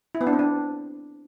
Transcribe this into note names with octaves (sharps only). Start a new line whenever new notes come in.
E4
B3
D4
C4
D4